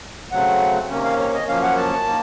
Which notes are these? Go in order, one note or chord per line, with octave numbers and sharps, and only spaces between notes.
C#3 F#3 A3 C4 F#5
C3 D#3 A#3 C#4
F5
C#5
D#5
F#2 F3 A#3 C#4 F5
F#5
A5
D#3 A#3